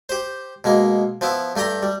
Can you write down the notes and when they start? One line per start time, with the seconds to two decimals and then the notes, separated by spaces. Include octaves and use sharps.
0.09 G4 C5
0.64 B2 G#3 A#3
1.21 F3 B3 E4
1.56 G2 A3 G4 G5 A#5
1.83 G3